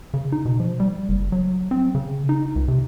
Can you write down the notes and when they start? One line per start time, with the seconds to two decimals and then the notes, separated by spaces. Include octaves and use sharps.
0.14 C#3
0.32 D#4
0.45 B2
0.60 F3
0.80 G3
1.09 F#1
1.32 F#3
1.71 C4
1.95 C#3
2.29 D#4
2.56 C#2
2.68 C3